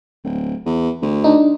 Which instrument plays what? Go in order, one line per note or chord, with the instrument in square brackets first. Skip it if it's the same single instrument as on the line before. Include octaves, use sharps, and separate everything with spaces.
[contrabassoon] D1
E2
D2
[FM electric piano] D4 D#4